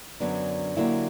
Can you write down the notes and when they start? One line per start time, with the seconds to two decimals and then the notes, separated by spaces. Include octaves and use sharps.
0.20 F#2 D3 F#3 B3 D4
0.77 D3 F#3 A#3 E4 G4